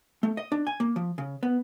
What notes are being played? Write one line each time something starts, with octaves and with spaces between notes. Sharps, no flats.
A3
D#5
D4
G#5
A#3
F3
C#3
B3